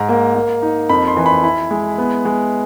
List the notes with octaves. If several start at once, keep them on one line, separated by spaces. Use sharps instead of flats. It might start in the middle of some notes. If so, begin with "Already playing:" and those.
Already playing: G#2 A#5
A#3
A#3
D#4
F2 B5
C6
E3
B5
E4 B5
G#3
B3
G#3